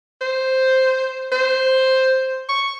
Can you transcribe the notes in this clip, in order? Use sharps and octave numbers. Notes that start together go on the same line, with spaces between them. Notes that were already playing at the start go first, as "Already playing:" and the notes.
C5
C5
C#6